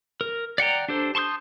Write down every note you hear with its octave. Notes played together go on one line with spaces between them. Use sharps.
A#4
D5 F#5 G5 A#5
D4 G4 A4 C5
A5 C6 C#6 D#6 G6